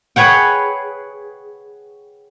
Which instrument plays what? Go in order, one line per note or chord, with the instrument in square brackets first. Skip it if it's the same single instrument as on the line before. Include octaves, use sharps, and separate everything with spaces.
[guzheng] G#4 B4 C#5 F#5 G5